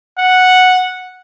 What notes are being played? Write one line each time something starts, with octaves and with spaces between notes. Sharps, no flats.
F#5